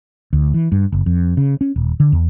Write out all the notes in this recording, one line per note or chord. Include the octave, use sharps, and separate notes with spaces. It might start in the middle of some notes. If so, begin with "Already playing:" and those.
D2
E3
G2
F#1
F2
C#3
C#4
D#1
D3
E2